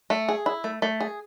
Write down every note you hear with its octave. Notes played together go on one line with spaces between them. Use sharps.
A3
G#4
E4
A3
A3
G#4